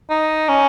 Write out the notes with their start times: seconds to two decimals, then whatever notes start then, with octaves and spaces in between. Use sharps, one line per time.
0.10 D#4
0.49 C#4